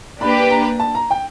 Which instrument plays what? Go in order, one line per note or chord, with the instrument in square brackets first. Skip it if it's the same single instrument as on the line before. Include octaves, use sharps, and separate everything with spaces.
[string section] A#3 D4 G4 B4 [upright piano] B5
[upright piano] A#5
A5
A#5
G5